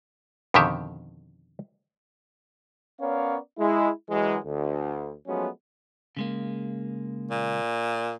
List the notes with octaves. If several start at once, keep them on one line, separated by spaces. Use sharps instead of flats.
F2 B2 D3 D#3 G4 E5
B3 C#4 A#4 C#5 D5 F5
G#3 E4
F#2 E3 F#3 G#3
D2
F3 F#3 G#3 A3 B3 C#4
C#3 G#3 A#3
A#2